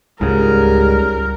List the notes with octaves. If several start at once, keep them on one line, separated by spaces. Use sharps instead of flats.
C#2 G#2 C#3 G3 A#4